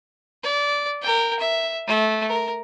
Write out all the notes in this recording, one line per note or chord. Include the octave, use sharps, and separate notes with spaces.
D5
A#4 G5
E5
A3
A#4